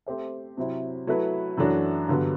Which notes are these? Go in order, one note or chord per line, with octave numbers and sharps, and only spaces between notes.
A3 C4 G4 C5 E5
C3 F#3 C4 E4
F#3 A3 E4 B4
F#2 E3 A3 D4 F#4
G2 D3 F#3 B3